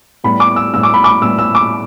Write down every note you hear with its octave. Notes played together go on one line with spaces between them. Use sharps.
A2 G3 B3 B5
D6
E6
A2 G3 B3 E6
D6
B5
D6
A2 G3 B3 E6
E6
D6